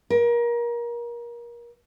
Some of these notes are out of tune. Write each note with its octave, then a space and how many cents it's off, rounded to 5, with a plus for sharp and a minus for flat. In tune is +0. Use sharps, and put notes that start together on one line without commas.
A#4 +30